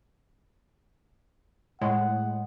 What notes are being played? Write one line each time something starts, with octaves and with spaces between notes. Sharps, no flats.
A2 G#3 F#5